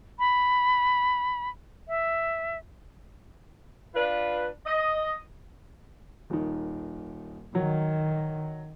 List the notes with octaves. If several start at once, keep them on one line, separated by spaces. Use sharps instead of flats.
B5
E5
D4 F4 B4
D#5
D#1 D#3
D#3 F#3